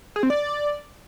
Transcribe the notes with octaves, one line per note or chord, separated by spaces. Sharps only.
G#4
C4
D5